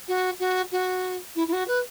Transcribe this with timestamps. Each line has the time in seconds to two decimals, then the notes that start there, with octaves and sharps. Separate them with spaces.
0.08 F#4
0.39 F#4
0.71 F#4
1.35 E4
1.47 E4
1.52 F#4
1.67 B4